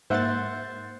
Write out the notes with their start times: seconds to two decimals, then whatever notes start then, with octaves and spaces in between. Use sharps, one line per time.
0.10 G#2 A#3 C5 E5 F#5 A6